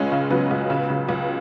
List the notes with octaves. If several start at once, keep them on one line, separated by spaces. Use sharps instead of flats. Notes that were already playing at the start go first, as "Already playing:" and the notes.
Already playing: C#2 G#3 C#4
C#3
C#3 F#3 B3
C#2
C#3
C#3
C#2